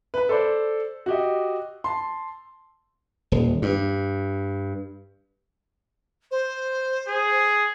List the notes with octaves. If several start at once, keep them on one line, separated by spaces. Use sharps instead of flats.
B4 B5
A4 C5 D5
F#4 G4 D#5
A5 C6
D#1
G2
C5
G#4